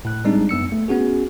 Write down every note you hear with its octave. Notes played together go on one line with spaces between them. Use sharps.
A2 F#6
G3 G#3 C4 D4 D#4
F#2 B3 E6 C#7
A3
B3 C#4 F#4 G#4